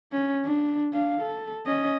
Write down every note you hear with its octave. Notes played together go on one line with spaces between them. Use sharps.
C#4
D4
D4 F5
A4
C#4 D#5